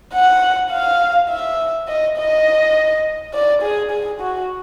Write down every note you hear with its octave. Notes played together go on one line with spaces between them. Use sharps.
F#5
F5
E5
D#5
D#5
D5
G#4
G#4
F#4